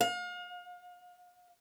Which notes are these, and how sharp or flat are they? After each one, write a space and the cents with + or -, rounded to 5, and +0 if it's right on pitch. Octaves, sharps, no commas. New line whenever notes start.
F5 +40